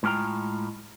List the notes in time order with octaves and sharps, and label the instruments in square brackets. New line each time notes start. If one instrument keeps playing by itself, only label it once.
[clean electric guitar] A2 G#3 B3 F4 G5 A#5